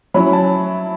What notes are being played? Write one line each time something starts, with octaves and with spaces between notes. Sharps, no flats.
F#3 C#4 E4 B5
A5